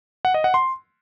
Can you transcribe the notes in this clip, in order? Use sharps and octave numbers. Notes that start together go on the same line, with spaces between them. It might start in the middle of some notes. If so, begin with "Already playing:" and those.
F#5
D#5
F#5
C6